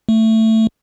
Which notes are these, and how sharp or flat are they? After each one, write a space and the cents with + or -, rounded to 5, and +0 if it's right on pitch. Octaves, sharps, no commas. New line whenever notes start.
A3 +15